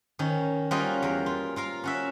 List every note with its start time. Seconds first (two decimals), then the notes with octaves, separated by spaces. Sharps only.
0.19 D#3 C#4
0.71 G3 A#3 C#4 F4 F#4 D#5
1.02 E2 A#4
1.26 F4
1.56 F4 A#4 F5
1.84 C#4 F#4 E5